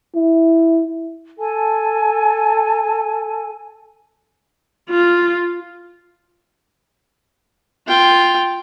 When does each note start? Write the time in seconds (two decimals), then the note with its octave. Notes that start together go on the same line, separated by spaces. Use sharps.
0.15 E4
1.39 A4 G#5 A5
4.89 F4
7.87 F4 G5